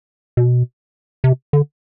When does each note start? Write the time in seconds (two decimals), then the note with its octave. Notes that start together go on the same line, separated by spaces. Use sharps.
0.37 B2
1.24 C3
1.53 D3